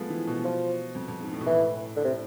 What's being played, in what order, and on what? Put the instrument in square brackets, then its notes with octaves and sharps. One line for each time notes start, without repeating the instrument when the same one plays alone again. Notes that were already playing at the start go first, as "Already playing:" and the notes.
Already playing: [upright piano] F3 G#3 A3 B3
E3
B2
[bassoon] F3
[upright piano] F2
F2
G#2
A2
B2
[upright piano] A2 [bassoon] E3
[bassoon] D3
C3